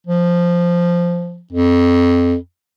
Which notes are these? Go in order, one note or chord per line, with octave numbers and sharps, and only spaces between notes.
F3
F2